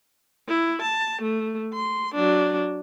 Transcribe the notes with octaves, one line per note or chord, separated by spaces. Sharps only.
E4
A5
A3
C6
F#3 D4